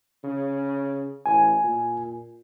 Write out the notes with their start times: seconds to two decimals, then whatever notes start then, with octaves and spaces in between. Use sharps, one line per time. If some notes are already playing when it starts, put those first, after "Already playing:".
0.24 C#3
1.26 A1 G#5
1.64 A#2